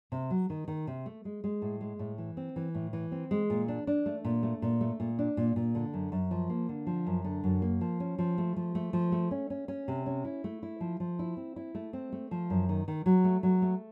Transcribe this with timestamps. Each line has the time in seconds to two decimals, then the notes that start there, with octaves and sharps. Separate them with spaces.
0.12 C3
0.30 F#3
0.50 D#3
0.68 D#3
0.87 C3
1.06 A3
1.25 G#3
1.44 G#3
1.62 A2
1.81 G#3
1.99 A2
2.18 E3
2.37 C4
2.56 E3
2.75 A2
2.93 E3
3.12 C4
3.31 G#3
3.50 A#2
3.68 D4
3.87 D4
4.06 A3
4.24 A#2
4.43 A3
4.62 A#2
4.81 A3
5.00 A#2
5.19 D4
5.37 A#2
5.56 A#2
5.75 D3
5.93 F#2
6.12 F#2
6.31 F3
6.50 A#3
6.69 D3
6.87 F3
7.07 F#2
7.24 D3
7.44 F#2
7.62 A#3
7.81 F3
8.00 C#4
8.18 F3
8.38 A3
8.56 F3
8.75 A3
8.93 F3
9.12 A3
9.31 C#4
9.50 C#4
9.68 C#4
9.88 C3
10.06 C#4
10.25 E4
10.44 A3
10.63 E4
10.80 F3
11.00 F3
11.19 E4
11.37 C4
11.56 E4
11.75 A3
11.93 C4
12.12 A3
12.31 F3
12.50 F#2
12.69 D#3
12.88 D#3
13.06 F#3
13.24 A3
13.43 F#3
13.62 A3